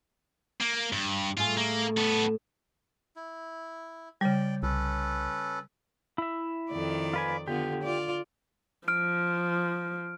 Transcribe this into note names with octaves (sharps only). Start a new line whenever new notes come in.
A#3
G2
A2 A3 F4 G#4
A#3
B3 A4
E4
C#3 G3 D5 G5
C2 C#4 A4 B4
E4 E5
F2 D#3 D5
F4 B4 G#5
D3 B3 F4 G4
F4 D5
F3 F6 D7